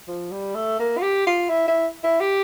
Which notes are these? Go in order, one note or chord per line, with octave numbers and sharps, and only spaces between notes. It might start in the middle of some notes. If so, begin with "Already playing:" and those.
F3
G3
A3
A#3
F4
G4
F4
E4
E4
E4
G4